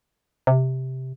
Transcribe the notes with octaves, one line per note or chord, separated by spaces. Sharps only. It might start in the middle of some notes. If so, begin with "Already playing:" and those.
C3